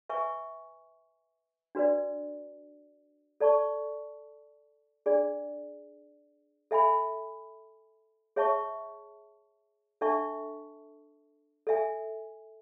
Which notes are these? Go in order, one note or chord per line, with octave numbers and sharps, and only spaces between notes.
B4 E5 G#5 C#6
D4 F#4 B4 D5
A4 D5 A5 C#6
D4 G#4 D5
A4 E5 G#5 B5
G#4 C#5 E5 A5 C#6
D4 A4 E5 A5 C#6
A4 E5 G#5